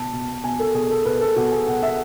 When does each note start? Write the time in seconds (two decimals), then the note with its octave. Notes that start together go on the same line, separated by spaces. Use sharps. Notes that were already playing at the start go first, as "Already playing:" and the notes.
Already playing: B2 A5
0.13 B2
0.44 B2 G#5
0.59 A4
0.74 B2 G#4
0.90 A4
1.05 B2 B4
1.21 A4
1.36 B2 F#4
1.51 G#4
1.67 B2 F#5
1.83 E5